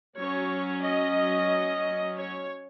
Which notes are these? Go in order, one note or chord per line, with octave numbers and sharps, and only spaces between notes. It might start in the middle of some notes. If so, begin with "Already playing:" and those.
F#3 C#4 C#5
D#5
C#5